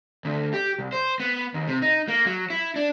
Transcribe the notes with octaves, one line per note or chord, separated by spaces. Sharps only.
D2
G4
C2
C5
B3
D#2
C3
D#4
A#3
F#3
E4
D4